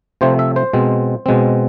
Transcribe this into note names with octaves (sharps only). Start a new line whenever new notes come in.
C3 F3 A3 C4 C5
E5
C5
B2 G#3 C4
B2 G#3 C4